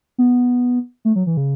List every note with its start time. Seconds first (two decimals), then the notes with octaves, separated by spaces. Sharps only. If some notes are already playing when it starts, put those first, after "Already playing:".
0.18 B3
1.05 A3
1.16 F#3
1.27 E3
1.37 C#3